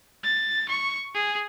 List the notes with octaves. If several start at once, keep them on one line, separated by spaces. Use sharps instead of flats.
A6
C#6
G#4